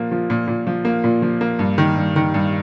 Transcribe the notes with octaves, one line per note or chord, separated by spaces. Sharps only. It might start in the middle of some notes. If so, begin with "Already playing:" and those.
Already playing: A#2 F3 A#3
F3
A#2
A#2
F3
A#3
A#2
F3
A#3
G2
D#3
G2
D#3
G2